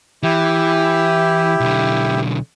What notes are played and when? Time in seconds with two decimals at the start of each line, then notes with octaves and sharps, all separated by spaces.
0.23 E3 E4 G4
1.60 B1 D3